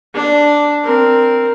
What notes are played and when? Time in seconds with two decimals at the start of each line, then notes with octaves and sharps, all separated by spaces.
0.14 D4
0.84 C4 A#4